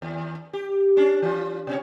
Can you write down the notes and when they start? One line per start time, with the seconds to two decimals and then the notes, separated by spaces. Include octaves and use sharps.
0.02 D#2
0.53 G4
0.97 C#4 D4
1.22 E3 F4
1.67 B2 C#4 C#5